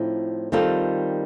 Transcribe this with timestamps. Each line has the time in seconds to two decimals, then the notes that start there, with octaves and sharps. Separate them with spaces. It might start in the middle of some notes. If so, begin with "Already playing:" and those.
Already playing: A2 F3 C4 D#4
0.52 D#3 G3 C4 F4 A4